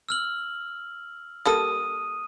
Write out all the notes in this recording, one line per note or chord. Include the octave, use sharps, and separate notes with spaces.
E6 F6 F#7
G3 A#3 A4 D#6 D#7